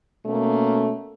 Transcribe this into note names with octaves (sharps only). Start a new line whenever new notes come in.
B2 A3 A#3 C#4